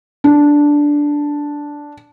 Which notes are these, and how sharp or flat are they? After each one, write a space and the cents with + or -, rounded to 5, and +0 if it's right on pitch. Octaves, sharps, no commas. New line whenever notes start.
D4 -5